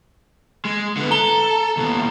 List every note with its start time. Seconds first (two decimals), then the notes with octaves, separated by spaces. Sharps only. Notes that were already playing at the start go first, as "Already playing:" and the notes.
0.65 G#3
0.97 D3 B3
1.11 A4 A#5 G7
1.77 D#2 B2